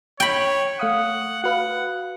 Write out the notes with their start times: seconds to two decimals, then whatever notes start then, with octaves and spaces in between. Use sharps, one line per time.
0.20 C#5 G5 B5
0.79 A3 F5 F#5 D#6
1.44 F#4 B4 F5 F#5